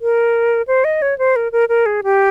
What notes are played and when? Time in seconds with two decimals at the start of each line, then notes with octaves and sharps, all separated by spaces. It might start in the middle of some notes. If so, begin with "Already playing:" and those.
0.01 A#4
0.68 C5
0.84 D#5
1.02 C#5
1.18 C5
1.36 A#4
1.52 A#4
1.69 A#4
1.86 G#4
2.03 G4